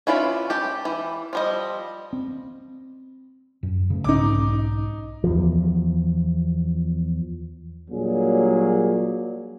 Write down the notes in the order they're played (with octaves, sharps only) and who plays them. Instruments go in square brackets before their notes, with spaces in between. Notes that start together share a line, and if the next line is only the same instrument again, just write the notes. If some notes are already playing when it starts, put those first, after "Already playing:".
[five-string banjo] C#4 E4 F4 B4 D5
G4 A5
E3
F3 G3 D#5
[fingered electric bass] C4
F#2
C#3 A3
[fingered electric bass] B1 G#2 [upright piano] D#4 D6
[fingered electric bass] E2 F3
[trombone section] A#2 F#3 G3 A#3 D4 G#4